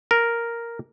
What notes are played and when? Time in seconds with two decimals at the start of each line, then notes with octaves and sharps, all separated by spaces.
0.11 A#4